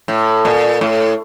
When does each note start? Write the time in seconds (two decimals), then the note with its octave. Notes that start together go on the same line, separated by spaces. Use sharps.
0.08 A2
0.45 A#2
0.81 A2